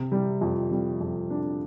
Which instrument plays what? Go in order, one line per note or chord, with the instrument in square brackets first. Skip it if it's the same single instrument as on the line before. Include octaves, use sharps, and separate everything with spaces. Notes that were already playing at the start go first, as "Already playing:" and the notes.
Already playing: [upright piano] C3
G3
F2
G3
F2
D4